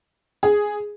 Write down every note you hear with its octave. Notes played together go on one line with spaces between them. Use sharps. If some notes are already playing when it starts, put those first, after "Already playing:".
G#4